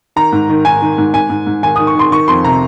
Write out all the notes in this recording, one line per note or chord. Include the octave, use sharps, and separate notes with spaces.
D#3 A#5
G#2
D#3
D#3 G#5
D#3
G#2
G#2 G#5
G#2
G#2
D#3 G#5
D#3 D#6
C#6
D#3 C6
D#3 C#6
F2 C6
C3 A#5